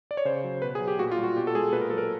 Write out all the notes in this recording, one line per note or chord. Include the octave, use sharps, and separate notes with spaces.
D5
C#5
C#3 C5
F#3
B2 B4
G#4
F#3
G4
A#2 F#4
F4
G3
F#4
B2 G4
A4
G#3 G#4
A#2 B4
A#4
F#3 A4
A#4